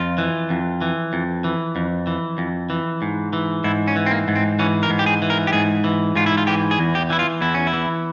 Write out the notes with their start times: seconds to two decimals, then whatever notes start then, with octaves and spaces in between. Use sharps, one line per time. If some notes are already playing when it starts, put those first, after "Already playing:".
Already playing: F2 F4
0.18 E3
0.50 F2
0.82 E3
1.13 F2
1.44 E3
1.76 F2
2.07 E3
2.38 F2
2.70 E3
3.02 G#2
3.33 E3
3.64 G#2 E4
3.88 C#4
3.96 E3
4.06 C4
4.11 A#3
4.28 G#2
4.36 C4
4.59 E3 C#4
4.83 A#4
4.90 G#2
4.99 G4
5.06 G#4
5.22 E3
5.30 A#4
5.47 G4
5.53 G#2 G#4
5.84 E3
6.16 G#2 F4
6.26 E4
6.37 F4
6.47 E3 G4
6.71 G#4
6.79 E2
6.95 G4
7.10 E3 E4
7.19 F4
7.41 E2 E4
7.54 C#4
7.67 E4
7.73 E3